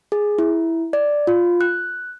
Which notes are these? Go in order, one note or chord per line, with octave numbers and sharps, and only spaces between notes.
G#4
E4
D5
F4
F#6